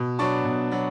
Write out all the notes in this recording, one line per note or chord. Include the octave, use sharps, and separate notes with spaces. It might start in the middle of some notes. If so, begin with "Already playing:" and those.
Already playing: B2
F#3 B3 D4 A5 C#6
B2
F#3 B3 D4